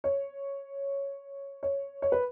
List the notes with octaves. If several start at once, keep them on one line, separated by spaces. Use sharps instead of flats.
C#5
C#5
C#5
B4